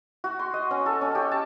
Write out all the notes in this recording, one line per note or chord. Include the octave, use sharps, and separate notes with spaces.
F#4
C6
D#5
C#4
A4
C#4
G4
A5